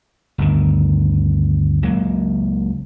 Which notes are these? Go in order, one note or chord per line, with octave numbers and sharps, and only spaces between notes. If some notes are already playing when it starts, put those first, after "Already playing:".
G1 D2 D#3
C#2 F#3 A#3